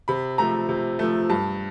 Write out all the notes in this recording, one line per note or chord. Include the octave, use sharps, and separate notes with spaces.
C3 B5
F3 A3 A#5
C3
F3 A3
G2 A5